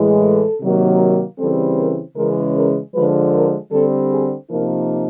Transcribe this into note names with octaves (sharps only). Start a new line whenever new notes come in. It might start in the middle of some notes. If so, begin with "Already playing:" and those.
Already playing: A2 E3 G#3
A4
C3 D#3 F#3 A#3
C#3 E3 G3 C4 A4
A#4
C#3 E3 G#3 C#4 A#4
A#4
D3 F3 G#3 B4
A#4
D3 G3 C4 A4
G#4
C3 F3 A#3 D#4 A#4